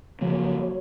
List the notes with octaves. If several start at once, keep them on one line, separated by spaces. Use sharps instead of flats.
C#3 F3 F#3 A#3